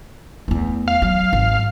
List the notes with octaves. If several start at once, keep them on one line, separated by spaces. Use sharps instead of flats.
E2 A3
F5
F#3
G#1